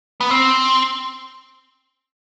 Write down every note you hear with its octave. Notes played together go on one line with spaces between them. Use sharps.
B3
C4